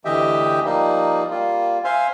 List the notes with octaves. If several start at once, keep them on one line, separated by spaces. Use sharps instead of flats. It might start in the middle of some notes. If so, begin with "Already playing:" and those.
D2 E3 G4 D#5 E5 G5
F3 G3 A#3 D#4
G3 A#3 F4
C5 E5 F5 G#5 C6